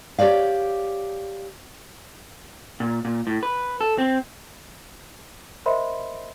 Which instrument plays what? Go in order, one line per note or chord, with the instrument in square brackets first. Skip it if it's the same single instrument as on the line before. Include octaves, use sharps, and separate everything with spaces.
[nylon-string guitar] G4 A4 C#5 D5 F5
[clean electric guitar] A#2
A#2
A2
B4
A4
C4
[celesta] A#4 C5 D#5 E5 B5 C6